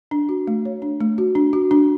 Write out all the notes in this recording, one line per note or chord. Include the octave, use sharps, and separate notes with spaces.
D4
F#4
A3
C#5
D4
A3
F#4
D4
F#4
D4